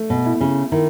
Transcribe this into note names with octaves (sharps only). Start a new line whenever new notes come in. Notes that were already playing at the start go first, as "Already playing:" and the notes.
Already playing: A3
B2
E4
C#3
D#3 E4